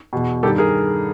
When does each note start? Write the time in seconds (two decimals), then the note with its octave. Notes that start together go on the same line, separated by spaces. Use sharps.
0.13 E2 B2
0.43 G2 D#3 G4 A4
0.58 G#4 A#4